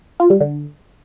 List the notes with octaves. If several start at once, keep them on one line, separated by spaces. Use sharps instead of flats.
F4
G3
D3